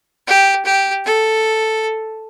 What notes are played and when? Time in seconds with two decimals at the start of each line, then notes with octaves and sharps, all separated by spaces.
0.27 G4
0.65 G4
1.04 A4